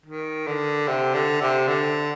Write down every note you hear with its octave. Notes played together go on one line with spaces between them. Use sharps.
D#3
D3
C3
D3
C3
D3